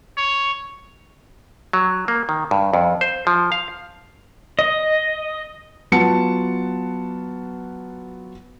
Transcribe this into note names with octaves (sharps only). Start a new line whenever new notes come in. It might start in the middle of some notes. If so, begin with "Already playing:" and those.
C#5
F#3
A#3
D#3
G2
F2
C5
F3
F5
D#5
F#3 B3 F4 F#5 A5 C#7